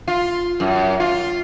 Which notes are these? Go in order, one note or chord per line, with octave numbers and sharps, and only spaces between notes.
F4
F#2
F4